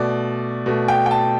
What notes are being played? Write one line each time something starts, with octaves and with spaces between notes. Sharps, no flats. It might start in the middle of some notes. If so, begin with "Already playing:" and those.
Already playing: B2 A3 D5
B2 A3
G5
G5
A5